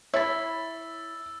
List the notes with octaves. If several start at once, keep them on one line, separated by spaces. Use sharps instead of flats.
E4 C#5 B5 E6 A6